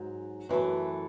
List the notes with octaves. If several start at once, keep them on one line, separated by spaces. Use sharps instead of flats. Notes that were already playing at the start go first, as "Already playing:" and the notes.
Already playing: G#2 F#3
F#2 E3 A3